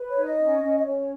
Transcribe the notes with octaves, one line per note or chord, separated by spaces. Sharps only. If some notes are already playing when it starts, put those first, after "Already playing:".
Already playing: B4
C#5
D#4
D#5
C#4
C#4
D#5
C#4 C#5